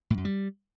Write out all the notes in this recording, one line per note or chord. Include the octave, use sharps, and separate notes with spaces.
A2
F#2
G3